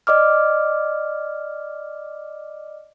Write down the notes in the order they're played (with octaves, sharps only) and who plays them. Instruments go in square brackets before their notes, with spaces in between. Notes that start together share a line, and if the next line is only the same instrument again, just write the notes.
[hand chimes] D5 D#5 D6 F6